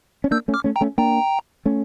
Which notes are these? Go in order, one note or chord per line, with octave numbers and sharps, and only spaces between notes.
C#4
A#3 D4 E6 G6
A3 C#4
D6 F6
A3 C#4
G5 A#5
A3 C#4
A#3 D4 G5 A#5
A3 C#4